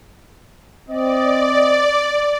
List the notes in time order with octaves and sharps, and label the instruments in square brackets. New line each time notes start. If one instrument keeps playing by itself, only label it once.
[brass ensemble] C4 D#5 [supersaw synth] D5